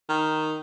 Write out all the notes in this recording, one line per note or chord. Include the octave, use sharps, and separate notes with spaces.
D#3